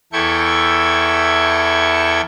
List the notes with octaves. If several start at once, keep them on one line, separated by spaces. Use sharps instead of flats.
E2 E4 A4 G5 C#6 G#6